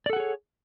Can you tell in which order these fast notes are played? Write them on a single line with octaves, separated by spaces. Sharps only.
D5 A4 F#5 G#4 C#5